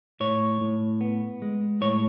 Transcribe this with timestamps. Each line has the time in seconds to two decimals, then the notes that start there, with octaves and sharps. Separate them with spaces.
0.20 A2 C#5
0.61 A2
1.01 B3
1.42 G#3
1.81 A2 C#5